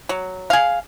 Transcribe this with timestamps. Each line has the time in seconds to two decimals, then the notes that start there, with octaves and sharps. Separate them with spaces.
0.09 F#3
0.50 G#4 F5